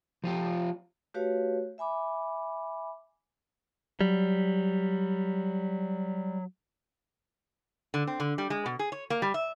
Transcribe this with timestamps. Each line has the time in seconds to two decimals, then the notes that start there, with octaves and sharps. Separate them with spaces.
0.24 F3 F4 G4
1.14 A3 F#4 G4 B4 C#5 F5
1.78 E5 G#5 B5 D6
4.01 F#3 G3
7.94 D3
8.07 C4
8.20 D3
8.38 G3
8.50 G#3
8.66 B2
8.79 G#4
8.92 C#5
9.10 A#3
9.22 G3
9.34 E5